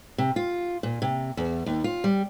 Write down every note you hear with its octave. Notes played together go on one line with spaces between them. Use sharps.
C3
F4
A#2
C3
E2
D#2
F4
G3